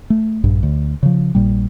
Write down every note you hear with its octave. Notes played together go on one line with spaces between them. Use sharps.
A3
A#1 G2
D2
C#3 F3
A#1 A#2 G3